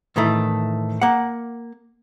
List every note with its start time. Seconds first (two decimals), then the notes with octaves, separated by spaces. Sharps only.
0.16 A2 D#3 E3 A3
1.02 A#3 F#5